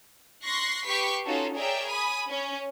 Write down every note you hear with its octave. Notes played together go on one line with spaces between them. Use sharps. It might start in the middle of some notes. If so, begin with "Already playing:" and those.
C6 C#6 F#6 A#6 C7
G4 B4 C#6 B6 C7
C#4 D#4 F4 F#4 A4
G#4 A#4 C#5 D5 E5 G5
G#5 B5 D#6
C#4